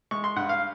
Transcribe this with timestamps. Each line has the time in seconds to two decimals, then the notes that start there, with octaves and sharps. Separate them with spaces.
0.11 G#3 C#6
0.24 C6
0.36 G2 F#5
0.49 F5